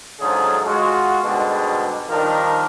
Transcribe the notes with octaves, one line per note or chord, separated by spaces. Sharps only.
G#2 D3 F3 F#3 C#4 G#4
G#3 F4 F#4
G#2 B2 D3 G3 G#3
D#3 F3 G3 D4 D#4 A#4